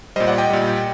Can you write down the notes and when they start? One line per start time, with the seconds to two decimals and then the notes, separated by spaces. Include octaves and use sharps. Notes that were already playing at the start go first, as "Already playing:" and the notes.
0.16 A#2 G3 C5 D#5
0.27 D5 F#5
0.38 D#5 G5
0.50 A#2 G3